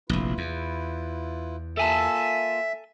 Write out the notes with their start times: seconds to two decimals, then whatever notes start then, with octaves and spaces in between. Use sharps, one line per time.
0.09 F1 A#1 E4 F4 B4
0.38 E2
1.77 A#3 F4 A4 E5 G#5 A5